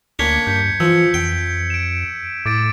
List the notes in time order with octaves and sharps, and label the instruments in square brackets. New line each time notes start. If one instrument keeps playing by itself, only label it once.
[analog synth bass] D2 [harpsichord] A#3 C#4 D4 [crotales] G#6 B6 C#7
[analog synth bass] G2 [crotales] G6 B6 C#7
[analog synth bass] E3 [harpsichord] F3 [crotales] E6 C#7
[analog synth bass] F2 [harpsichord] G5
[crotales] D7 E7
[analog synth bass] A2 [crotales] D6 A6 D7